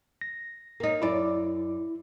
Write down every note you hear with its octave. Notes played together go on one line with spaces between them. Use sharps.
A#6
A#3 D#4
F#2 E4 D5